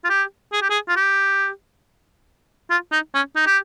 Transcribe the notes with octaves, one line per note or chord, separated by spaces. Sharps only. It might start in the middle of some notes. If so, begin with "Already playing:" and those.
F4
G4
G#4
G4
G#4
F4
G4
F4
D#4
C#4
D#4
G4